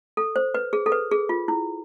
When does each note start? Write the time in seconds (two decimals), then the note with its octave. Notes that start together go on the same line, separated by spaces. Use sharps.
0.17 A4
0.36 C5
0.54 B4
0.73 G#4
0.86 A4
0.92 B4
1.11 G#4
1.29 F4
1.48 E4